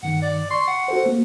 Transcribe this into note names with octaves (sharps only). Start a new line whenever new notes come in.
G2 D#3 F#5
D5
C6 C#6
F#5
F#4 A4 C5
A#3